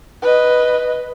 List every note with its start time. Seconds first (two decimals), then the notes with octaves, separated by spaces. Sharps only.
0.22 B4 D#5